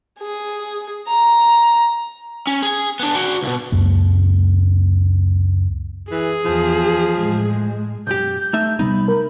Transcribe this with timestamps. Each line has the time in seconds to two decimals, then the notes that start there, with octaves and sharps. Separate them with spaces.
0.20 G#4
1.08 A#5
2.47 C#4
2.63 G#4 G#5
2.99 B3 D4
3.15 F#4 D5
3.42 C#2 B2
3.72 C#2 F#2 A#3
6.11 E3 G#4
6.45 E2 F3
7.17 A2 G#3
8.07 B1 F#2 G4 G6
8.53 A3 D#4 E5
8.79 C3 G3 B3 D#4 B5
9.08 A#4